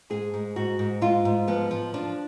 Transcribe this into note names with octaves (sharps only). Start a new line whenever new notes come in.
G#2 G#4
G#2
G#2 F#4
G#2
G#2 F4
G#2
F3 B3
F3
F3 D4